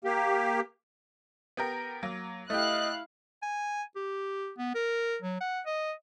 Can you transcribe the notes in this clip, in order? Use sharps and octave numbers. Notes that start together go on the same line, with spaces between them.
A#3 G4
B3 G4 A#4
F#3 A#3
A3 E4 G4 D#5 F5 F#6
G#5
G4
B3
A#4
F#3
F#5
D#5